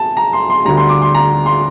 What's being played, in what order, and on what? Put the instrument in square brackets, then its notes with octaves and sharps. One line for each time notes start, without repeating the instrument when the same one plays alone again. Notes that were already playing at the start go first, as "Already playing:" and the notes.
Already playing: [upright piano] A5
A#5
C6
C6
D2 D3 G3 A#5
C6
D6
C6
A#5
C6